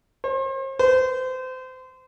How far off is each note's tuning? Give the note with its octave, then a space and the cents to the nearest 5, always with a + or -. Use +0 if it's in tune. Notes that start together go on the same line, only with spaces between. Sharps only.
C5 +40
C5 -30